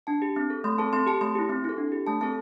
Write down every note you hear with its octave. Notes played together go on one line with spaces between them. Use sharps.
D4 A5
G4
C4
A4
A3 C6
C4 A4 A5
C4 C6
G4 A5
A3 C6
E4 G4
C4
E4 A4
D4
G4
A3 A5
C4 A4 A5